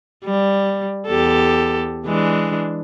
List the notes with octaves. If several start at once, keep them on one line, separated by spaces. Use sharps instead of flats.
G3
E2 G4 A4
E3 G#3 D4